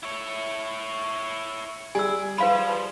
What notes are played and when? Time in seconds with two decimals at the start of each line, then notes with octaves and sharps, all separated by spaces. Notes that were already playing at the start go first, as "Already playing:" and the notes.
0.03 E4 C#5
1.95 G3 G#4 G#5 E6
2.38 F3 B4 F5 B5